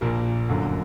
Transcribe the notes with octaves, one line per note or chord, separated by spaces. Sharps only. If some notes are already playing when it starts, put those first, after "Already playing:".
A#1 A#2 A#3
G1 F#2 D3